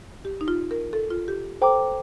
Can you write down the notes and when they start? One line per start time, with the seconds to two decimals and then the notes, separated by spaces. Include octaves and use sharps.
0.25 G4
0.41 D#4
0.48 F4
0.71 A#4
0.93 A4
1.10 F4
1.28 G4
1.61 A4 C5 G5 A#5 D6